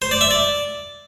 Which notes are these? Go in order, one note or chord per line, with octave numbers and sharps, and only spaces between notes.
C5
D5
E5
D5